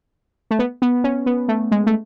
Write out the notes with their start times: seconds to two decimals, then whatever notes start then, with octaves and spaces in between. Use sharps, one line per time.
0.51 A3
0.59 B3
0.82 B3
1.04 C#4
1.26 B3
1.48 A3
1.72 G#3
1.87 A3